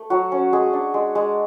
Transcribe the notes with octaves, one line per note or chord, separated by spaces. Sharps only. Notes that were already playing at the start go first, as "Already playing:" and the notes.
Already playing: A3
F#3 F#4
C#4
G#3 G#4
D4
G#3
G#3